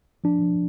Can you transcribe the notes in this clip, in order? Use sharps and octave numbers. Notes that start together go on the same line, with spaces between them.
F3 D4
F3